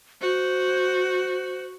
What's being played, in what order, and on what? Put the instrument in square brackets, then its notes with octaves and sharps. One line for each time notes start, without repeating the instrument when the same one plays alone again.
[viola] F#4 [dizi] C5